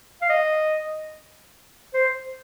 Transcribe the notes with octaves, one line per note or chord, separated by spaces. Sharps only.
F5
D#5
C5